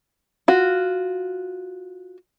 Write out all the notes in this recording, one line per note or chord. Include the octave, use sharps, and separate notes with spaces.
F4 F#4